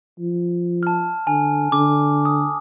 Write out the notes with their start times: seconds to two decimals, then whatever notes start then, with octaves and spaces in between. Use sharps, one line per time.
0.19 F3
0.83 A5 F6
1.27 D3 G#5
1.72 D3 D6
2.25 D#6